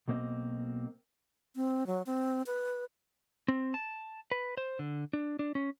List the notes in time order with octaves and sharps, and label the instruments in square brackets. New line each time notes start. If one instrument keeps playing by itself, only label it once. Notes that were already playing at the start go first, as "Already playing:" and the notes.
[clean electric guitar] B1 B2 A#3 C4 D#5
[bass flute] C4
F#3
C4
B4
[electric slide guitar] C4
A5
B4
C5
D3
D4
D4
C#4